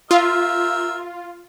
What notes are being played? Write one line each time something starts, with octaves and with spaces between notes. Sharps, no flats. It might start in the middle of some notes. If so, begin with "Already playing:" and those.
F4 G4 A#4 E5